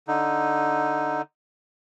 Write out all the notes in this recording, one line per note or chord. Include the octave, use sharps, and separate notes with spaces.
D3 D#4